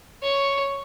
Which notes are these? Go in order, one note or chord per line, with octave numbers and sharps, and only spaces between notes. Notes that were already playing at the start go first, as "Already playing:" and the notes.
C#5 C#6